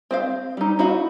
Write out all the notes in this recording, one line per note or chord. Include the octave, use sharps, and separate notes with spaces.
C4 C5 F5
G3 D#4
D#4 E4 F#4 D#5 F5